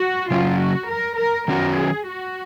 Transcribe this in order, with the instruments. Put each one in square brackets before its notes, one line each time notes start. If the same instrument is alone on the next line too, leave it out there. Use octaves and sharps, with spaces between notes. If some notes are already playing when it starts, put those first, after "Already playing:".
Already playing: [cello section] F#4
[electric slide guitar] C#3 F#3 C#4 [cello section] F4
[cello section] F#4
A#4
A#4
[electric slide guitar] D#3 F#3 C#4 F#4 [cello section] A#4
[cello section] G#4
F#4